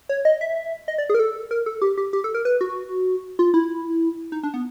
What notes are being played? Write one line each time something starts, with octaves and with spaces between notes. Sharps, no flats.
C#5
D#5
E5
D#5
D5
G#4
A#4
A4
A#4
A4
G4
G4
G4
A4
A#4
B4
F#4
F4
E4
D#4
D4
B3